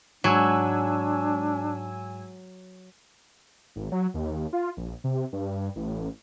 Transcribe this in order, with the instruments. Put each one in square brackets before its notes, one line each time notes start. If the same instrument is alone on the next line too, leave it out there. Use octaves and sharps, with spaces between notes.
[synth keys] G#2 G#5 E6 [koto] F#3 [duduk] D4
[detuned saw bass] G#1
F#3
D#2
F4
A#1
C3
G2
A1